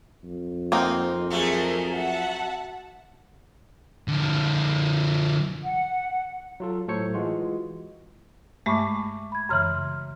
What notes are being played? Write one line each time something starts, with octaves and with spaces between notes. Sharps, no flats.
F2
A#3 C4 D#4
F#3 A3 G#4 A#4
E5 F#5 A5
D3 F3
F#5
F#3 F4 A4
A2 F#3 A4 C5 C#5 C#7
E3 G#3 F4 F#4
G2 G#3 A3 E5 C#6 D6
B5 G#6
F#2 C#3 E3 C6 F6